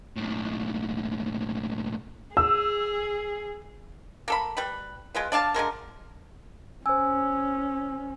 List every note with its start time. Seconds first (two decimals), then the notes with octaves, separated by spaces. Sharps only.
0.17 B1 A2
2.37 G#4 E6
4.28 A#3 A4 B5
4.57 G3 B4 B5
5.15 G#3 F4 B4
5.32 D4 D5 F5 A5
5.54 D3 F3 G#3 A#4
6.86 C#4 C5 G#5 E6